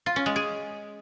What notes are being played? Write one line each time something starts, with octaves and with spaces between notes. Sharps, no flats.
F4
C#4
G#3
G#4